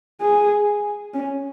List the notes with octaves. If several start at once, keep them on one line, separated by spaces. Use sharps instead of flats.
G#4
C#4